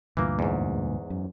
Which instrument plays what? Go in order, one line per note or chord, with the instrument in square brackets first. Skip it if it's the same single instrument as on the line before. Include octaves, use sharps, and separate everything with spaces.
[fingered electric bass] D2 G2 A#2 [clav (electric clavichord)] E3 A#3
[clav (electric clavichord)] E2 G#2
[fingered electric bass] F#2